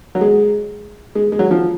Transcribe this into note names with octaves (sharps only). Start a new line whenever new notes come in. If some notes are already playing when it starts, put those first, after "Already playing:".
F#3
G#3
G#3
G#3
F#3
F3